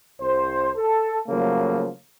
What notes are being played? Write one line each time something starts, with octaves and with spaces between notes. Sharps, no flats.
C2 C5
A4
C#3 F3 F#3 A3 A#3